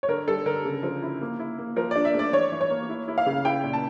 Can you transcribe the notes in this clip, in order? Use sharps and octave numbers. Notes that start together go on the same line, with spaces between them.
C#5
D3 A#4
G3 A4
D3 A#4
C#3
F3
E4
A#3
E4
A#3
F3 A#4
D5
D4
E5
A3 D5
E3 C#5
E3
C#5
A#3
E4
E4
F5
C#3
E4 G5
A#2
A5